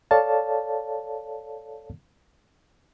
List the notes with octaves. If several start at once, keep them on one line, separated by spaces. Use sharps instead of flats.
A4 C#5 D5 F5 A5